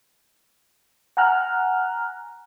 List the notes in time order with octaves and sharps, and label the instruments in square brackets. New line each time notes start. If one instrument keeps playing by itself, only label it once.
[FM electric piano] F#5 G#5 A#5 F6 F#6